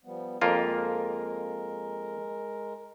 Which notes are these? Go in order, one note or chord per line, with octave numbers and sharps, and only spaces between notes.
F3 G3 B3
F2 G#3 A#3 F4 A#4